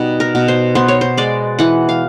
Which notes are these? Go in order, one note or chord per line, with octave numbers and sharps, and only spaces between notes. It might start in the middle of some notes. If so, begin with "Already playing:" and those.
Already playing: B2 G3 D#4
A#4
B2
C5
B3 C5
C#5
C5
G#3 D5
E3 F#5
F5